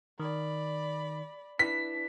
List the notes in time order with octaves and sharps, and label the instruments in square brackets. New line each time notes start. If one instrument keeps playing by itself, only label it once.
[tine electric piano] D#3 [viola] D5 B5
[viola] D4 [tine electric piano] E4 B4 [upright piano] B6